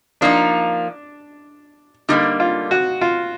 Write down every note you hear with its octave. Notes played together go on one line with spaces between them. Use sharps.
F3 A#3 D4 D#4
D3 G3 A#3 D#4
F4
F#4
F4